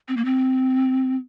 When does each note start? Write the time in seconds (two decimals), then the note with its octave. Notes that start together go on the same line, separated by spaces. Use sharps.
0.08 C4
0.17 A#3
0.25 C4